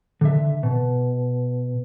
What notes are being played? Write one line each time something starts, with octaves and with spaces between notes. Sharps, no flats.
D3 E5
B2